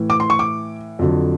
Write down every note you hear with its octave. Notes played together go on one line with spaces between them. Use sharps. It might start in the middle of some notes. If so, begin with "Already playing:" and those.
Already playing: A2 E3
D6
C6
C#6
D6
F2 D3 F#3